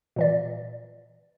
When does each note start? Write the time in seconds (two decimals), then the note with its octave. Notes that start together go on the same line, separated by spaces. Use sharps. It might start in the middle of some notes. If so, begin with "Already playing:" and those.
0.16 A#2 E3 D5